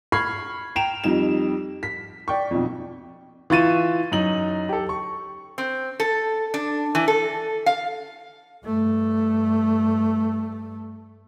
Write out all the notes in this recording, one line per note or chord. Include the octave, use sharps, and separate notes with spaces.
B5 C#6 F6 G#6 C7
G5 A#5 D7 E7 F7
F2 G3 D#4 E7
B6
D5 G5 C#6
B1 F2
E3 F4 C#6 A6 D#7 E7
F#2 D#4 F#7
G4 A4
C#6
C4
A4
D4
E3
A4
F5
G2 A3